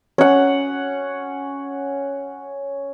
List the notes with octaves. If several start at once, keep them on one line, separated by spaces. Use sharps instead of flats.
C#4 F#5